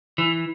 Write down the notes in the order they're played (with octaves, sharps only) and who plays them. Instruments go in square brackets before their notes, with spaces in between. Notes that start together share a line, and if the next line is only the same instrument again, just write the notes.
[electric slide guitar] E3